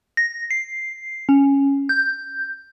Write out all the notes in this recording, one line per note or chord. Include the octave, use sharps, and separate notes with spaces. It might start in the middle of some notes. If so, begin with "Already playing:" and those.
A#6
C7
C#4
G6